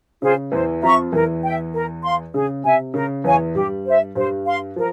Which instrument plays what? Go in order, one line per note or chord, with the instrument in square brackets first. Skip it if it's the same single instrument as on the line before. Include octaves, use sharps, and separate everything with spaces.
[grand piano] C#3 [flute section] F4 G#4 C5
[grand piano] E2 E3 [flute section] C5
[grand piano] F2 F3 [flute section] E5 A#5 C#6
[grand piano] E2 E3 [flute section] A#4
[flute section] E5 G5
A#4
F5 C6
[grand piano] C#3 [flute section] G#4
[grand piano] C3 [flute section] E5 G#5
[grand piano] C#3 [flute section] A#4
[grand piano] E2 E3 [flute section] C#5 F5 G#5
[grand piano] G2 G3 [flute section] G4
[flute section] C5 E5
[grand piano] G2 G3 [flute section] C5
[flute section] F5 C6
[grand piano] F3 [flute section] A#4